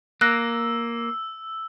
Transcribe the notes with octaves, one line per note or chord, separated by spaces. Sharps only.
A#3 E6 F#6 A#6